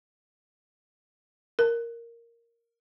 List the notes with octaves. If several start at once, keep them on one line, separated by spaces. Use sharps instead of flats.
A#4